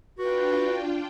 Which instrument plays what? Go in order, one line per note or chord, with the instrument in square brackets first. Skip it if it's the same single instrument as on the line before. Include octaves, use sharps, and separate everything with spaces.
[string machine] D4 F4 G5 [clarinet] F#4 [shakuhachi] B4